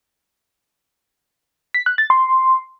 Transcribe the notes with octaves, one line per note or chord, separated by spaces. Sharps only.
B6
F#6
A6
C6